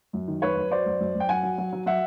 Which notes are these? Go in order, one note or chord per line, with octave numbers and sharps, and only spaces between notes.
F#2
D#3
F#2 B4 C#5
F#2
F#3 C5 D5
F#2
F#2
F#2
G5
F#3 F#5 G#5
F#3
F#3
F#3
F#3 E5 F#5